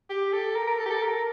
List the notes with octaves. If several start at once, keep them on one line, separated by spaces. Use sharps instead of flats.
G4
A4
A#4
A#4
A4
G4
A4
A#4